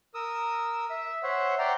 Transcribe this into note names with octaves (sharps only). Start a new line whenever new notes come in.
A#4 D#6 E6
E5
C5 C#5 E5 F#5
C5 D5 F#5 G5 A#5 C6